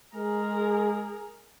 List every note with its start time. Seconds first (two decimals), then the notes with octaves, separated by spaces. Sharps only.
0.15 G#3 G#4 A#4